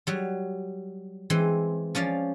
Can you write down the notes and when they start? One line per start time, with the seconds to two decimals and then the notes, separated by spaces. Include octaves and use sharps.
0.07 F#3 G3
1.30 E3 G#3 C4
1.95 F3 C#4 D5 F5